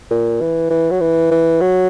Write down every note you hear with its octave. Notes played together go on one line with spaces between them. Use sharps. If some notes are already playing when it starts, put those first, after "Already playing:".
A#2
E3
E3
F#3
E3
E3
F#3